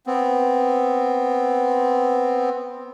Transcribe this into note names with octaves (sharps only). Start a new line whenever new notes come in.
B3 C4